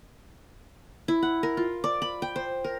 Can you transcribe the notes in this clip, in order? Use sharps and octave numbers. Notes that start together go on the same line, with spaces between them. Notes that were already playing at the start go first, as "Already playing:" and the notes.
E4
F#5
A#4
F4
D5
B5
G5
C5
A#4